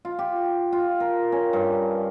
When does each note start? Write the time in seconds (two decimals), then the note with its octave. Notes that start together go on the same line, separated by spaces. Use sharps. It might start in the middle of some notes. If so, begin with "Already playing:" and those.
0.05 F4
0.19 G4
0.72 F4
1.00 A#4
1.32 C#4
1.53 G2